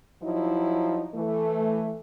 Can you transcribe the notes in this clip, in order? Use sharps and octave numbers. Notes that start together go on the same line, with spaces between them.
F3 F#3 D#4 E4
E3 A3